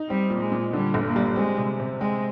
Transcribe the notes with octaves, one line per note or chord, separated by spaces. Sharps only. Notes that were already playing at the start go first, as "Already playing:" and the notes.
Already playing: D#4
G3 C4
A#2
G#3
A#2
D3 G3
G1
A#3
G3
G#3 C4
C3
C3
G#3 C4